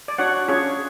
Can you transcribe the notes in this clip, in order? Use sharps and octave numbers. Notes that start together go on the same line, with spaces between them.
D5
D4 F#4 C#5 F#5
C#4 F4 G#4 C#5